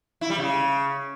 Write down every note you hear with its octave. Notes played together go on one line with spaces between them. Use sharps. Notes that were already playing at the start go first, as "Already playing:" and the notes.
E4
G3
C#3